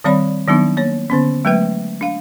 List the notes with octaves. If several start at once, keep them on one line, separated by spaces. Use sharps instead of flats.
D#3 G3 C4 C#5 D5 B5
D#3 F#3 B3 D4 D#4
A#3 C#5
D3 B3 C#4
F#3 G#3 A3 B4 E5
D4 F5